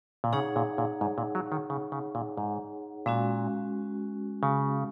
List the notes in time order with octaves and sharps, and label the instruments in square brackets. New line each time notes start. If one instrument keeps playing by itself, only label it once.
[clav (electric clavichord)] A#2
[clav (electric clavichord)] C#3 [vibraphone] D#4 G#4 C#5 F#5
[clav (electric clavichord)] A#2
A#2
G#2
A#2
F#3
D#3
C#3
C#3
A#2
G#2
[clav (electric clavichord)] A#2 [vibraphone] G#3 C#4 F#4
[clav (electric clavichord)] C#3